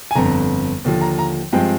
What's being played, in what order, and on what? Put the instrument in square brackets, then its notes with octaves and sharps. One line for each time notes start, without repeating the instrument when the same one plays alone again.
[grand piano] G#5
G1 F2 D3 A#5
D#2 D3 F3
A#5
A#5
G2 F3 G#3 C4 G5